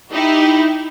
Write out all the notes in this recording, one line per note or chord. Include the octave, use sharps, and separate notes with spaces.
D#4 E4 G4